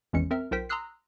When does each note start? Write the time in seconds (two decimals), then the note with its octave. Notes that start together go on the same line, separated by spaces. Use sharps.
0.13 G#1 E2 E3 G#3 C#4 C#7
0.31 C4 A#4 E5 F6
0.51 B1 F4 A#4 C5 G5 B6
0.69 A#5 C6 D#6 E6 F#6 C7